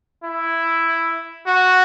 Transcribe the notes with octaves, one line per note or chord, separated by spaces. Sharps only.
E4
F#4